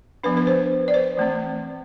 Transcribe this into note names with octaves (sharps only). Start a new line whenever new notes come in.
F3 B3 D4 B4
B4
C5
D5
C5
E3 A3 C4